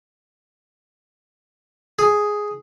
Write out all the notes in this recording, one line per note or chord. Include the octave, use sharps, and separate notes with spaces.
G#4